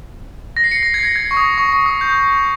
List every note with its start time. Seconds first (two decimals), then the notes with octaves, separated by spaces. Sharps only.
0.57 A#6
0.64 C7
0.71 A#6 C#7
0.83 A#6
0.94 G#6
0.99 C7
1.05 A#6
1.16 G#6
1.31 C#6
1.37 D#6
1.58 C#6
1.73 C#6
1.86 D#6
2.01 G6